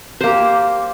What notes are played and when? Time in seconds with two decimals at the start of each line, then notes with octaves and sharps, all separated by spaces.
0.21 C5
0.24 A#3
0.27 G4